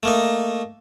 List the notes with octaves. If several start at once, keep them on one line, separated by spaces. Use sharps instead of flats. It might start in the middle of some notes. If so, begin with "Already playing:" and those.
A3 A#3 D#4